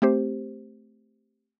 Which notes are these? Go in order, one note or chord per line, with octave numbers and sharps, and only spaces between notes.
A3 C4 G4 C5